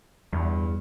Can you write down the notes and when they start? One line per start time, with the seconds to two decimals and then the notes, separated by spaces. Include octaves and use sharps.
0.33 E2 G2